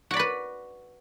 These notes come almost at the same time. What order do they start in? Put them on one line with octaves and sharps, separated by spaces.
F#4 D5 B5 B4